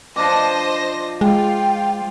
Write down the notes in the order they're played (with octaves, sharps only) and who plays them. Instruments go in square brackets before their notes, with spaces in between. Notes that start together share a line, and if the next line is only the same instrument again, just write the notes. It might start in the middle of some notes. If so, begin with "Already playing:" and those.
[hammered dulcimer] F3 D4 D6 [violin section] C5 D#5 A#6
[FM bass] G#3 [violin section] F4 [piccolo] G5